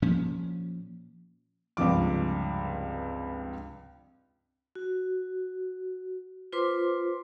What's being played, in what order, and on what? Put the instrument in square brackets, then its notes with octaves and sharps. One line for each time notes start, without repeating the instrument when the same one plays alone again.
[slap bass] A#2 F3 C#4
[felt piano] C#2 G2 C3 F3 D6
[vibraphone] F#4
F4 B4 C5 C6 D6